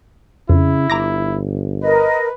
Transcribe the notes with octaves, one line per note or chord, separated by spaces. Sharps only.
F2 C#3 E4
G1 A#5 D6 A#6
A#4 B4 D#5